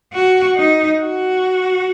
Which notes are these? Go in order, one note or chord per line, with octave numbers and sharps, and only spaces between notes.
F#4
D#4
F#4